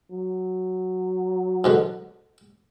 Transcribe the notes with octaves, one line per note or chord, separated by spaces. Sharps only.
F#3
G#2 B2 D3